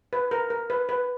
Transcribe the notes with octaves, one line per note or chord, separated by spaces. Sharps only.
B4
A#4
A#4
B4
B4